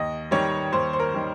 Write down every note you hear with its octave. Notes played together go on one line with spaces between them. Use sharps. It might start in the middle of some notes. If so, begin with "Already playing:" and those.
Already playing: D#2 D#5
D#3 G3 C#5
D#2 C5
C5
A#4
D#3 G3